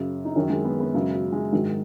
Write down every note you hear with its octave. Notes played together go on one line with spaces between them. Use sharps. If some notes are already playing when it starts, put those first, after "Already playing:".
Already playing: F#2 C#3
D#4
F#2 D#3 C#4
G#3
B3
B3
F#2 C#3 G#3
F#3
G#3
G#2 D#3 F#3